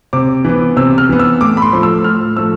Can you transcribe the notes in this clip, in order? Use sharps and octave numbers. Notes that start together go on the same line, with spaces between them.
C3 D6
E3 B3
C3 E6
F6
E3 B3
E6
A2 D6
B5
C6
F3 A3
E6
A2 F6
F3 A3 E6